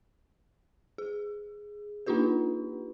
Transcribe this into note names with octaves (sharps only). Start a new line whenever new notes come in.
G#4
A#3 D4 D#4 F4 G4 B4